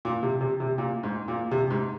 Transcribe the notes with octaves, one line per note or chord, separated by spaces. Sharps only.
A#2
C3
C3
C3
A#2
G#2
A#2
C3
G#2